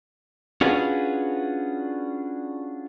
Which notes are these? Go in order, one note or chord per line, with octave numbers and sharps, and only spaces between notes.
C#4 D4 F4 F#4 G#4 B4